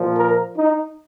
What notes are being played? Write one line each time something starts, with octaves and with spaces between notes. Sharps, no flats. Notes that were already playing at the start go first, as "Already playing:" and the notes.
Already playing: A#2 F3
A#4
D#4